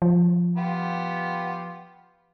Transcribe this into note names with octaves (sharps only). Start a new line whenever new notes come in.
F3
B3 F4 G4